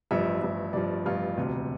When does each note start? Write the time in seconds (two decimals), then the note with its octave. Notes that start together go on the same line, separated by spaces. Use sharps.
0.11 A1 G2 F3 E5
0.41 A1 G2 F3
0.73 A1 G2 F3 D5
1.06 A1 G2 F3 F4
1.37 E1 D2 C3